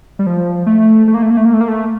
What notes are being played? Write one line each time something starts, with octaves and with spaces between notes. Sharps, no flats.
G3
F3
A3
A3
A#3
A3
A#3
A3
A#3
A3
A#3
A3